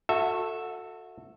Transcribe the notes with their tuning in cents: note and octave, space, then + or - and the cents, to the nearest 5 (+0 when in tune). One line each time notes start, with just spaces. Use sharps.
F#4 -25 A4 +15 E5 +0